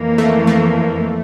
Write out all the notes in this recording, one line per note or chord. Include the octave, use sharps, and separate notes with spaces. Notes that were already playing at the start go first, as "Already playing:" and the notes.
Already playing: F2 E3 A#3
A3
A3